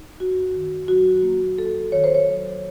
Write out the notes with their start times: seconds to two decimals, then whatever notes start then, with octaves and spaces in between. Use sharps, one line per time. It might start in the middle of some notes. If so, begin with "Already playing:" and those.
Already playing: D#4
0.19 F#2 F#4
0.55 D#3
0.88 F#3 F#4
1.23 A#3
1.58 F2 A4
1.92 D#3 C#5
2.04 C5
2.15 C#5
2.28 F#3